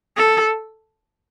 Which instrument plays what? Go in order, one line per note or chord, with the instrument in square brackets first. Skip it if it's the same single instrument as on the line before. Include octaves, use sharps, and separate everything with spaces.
[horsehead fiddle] A4